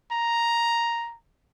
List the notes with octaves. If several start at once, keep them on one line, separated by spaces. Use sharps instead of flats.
A#5